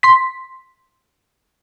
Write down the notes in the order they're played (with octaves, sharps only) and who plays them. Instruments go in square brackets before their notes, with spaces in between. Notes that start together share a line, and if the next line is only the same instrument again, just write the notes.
[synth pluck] C6 B6